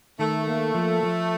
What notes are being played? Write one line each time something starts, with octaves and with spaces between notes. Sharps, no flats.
D#3 A3
A#3
F3
F3